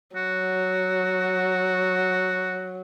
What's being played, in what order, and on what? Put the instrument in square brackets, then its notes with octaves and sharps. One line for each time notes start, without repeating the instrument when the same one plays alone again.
[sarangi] F#3 [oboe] F#4